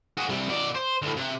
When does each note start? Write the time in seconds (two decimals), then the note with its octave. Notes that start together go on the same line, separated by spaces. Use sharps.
0.17 F#4 G#4
0.29 C3 G3
0.49 B2 D5
0.75 C5
1.02 D2 A2
1.16 C3